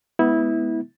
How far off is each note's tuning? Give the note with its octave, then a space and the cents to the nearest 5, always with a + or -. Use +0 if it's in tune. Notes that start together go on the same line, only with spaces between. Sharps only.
G#3 +30 B3 +0 E4 -20